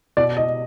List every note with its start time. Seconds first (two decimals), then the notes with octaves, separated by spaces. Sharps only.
0.17 B2 D5
0.37 D#5